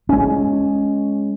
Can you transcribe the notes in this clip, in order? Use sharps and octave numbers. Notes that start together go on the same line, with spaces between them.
G#3 C#4